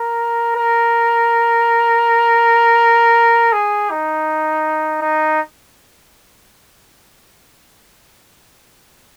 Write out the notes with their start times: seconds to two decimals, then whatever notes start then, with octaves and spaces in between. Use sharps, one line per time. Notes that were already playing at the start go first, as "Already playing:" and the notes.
Already playing: A#4
0.55 A#4
3.53 G#4
3.90 D#4
5.01 D#4